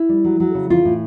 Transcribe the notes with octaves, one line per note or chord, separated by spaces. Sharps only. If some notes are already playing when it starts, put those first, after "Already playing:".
Already playing: E4
G3
F#3
F#3
C#3
E3 F4
A2